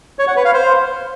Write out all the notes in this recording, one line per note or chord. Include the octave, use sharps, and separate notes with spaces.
C#5
F#5
B4
F5
C5